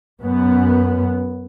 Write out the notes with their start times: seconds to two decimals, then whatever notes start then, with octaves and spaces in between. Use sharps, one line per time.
0.22 F#2 B3